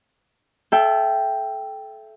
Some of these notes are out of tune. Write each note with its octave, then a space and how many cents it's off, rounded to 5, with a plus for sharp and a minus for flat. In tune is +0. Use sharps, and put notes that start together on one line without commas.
A4 -25 E5 +20 G5 +0